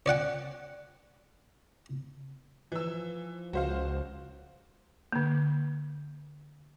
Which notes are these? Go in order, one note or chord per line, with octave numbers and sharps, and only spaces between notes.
C#5 D5 F#5 G5
E3 F3 E6
C#2 F#4 C5 F5
D3 A#3